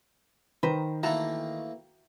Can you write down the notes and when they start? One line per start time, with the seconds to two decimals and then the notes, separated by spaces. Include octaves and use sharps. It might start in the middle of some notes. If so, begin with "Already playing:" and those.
0.63 D#3 B4 C5 A#5
1.03 E3 A3 A#3 F#4 A4 A#5